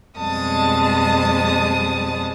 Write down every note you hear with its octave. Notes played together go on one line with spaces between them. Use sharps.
F2 B2 G3 G#3 A5 D#6